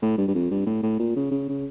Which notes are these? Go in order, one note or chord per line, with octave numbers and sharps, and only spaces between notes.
A2
G2
G2
F2
G2
A2
A2
A#2
C#3
C#3
C#3